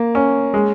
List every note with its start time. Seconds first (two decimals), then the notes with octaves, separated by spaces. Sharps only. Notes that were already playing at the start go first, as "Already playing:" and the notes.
Already playing: A#3
0.15 C#4
0.54 G#3